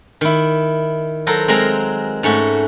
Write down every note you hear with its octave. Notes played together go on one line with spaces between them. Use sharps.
D#3 E4
F#3 A4 A#4 C5
F#3 G#3 C4 A#4 F5 A#5
G#2 A3 C#4 F#4